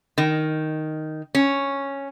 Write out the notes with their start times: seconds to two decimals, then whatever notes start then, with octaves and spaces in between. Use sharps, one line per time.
0.18 D#3
1.35 C#4